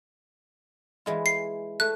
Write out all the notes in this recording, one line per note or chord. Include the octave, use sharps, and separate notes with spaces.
E3 G#3 F4
C7
A3 F#6